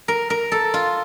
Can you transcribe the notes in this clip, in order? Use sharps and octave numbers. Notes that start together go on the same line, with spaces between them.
A#4
A#4
A4
F4